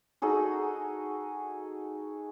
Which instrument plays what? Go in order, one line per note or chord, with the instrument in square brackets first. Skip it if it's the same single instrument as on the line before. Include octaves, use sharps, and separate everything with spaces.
[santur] D#4 F#4 G#4 A4